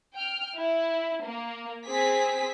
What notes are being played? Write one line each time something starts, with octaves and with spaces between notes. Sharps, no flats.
G5 F6
E4
A#3
C4 G#4 B6